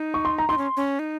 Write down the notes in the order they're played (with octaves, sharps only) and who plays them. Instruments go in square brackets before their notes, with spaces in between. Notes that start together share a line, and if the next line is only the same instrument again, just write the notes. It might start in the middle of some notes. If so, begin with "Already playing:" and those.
Already playing: [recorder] D#4
[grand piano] C#6
C6
A#5
[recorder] D#4 [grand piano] C6
[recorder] C#4
C#4
D#4